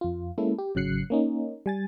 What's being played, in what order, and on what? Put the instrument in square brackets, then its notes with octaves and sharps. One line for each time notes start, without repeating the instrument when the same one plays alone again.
[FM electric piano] F2 F4
G#3 A#3 C#4 E4 A4
G4
G#1 C#3 F#3 F#6 C7 C#7
A#3 C#4 D#4
G3 G#5 A6